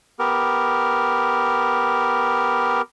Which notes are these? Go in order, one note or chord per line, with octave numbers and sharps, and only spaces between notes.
B3 G4 A#4